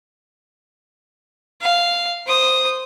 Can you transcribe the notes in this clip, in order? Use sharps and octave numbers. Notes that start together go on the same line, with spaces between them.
F5
C5 D#6